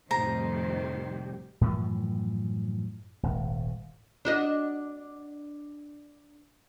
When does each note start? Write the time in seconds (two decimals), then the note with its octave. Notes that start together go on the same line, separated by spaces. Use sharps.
0.11 F2 A2 C3 D#3 G3 G4 C5 A#5
1.61 F#2 A2 E3 F3
3.23 D#1 G#1
4.25 D4 F#4 D#5